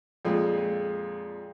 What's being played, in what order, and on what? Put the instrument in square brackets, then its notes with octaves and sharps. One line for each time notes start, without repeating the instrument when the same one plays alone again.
[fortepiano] F2 A#2 G#3